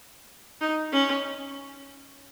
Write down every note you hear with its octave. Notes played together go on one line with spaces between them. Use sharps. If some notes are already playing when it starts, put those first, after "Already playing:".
D#4
C#4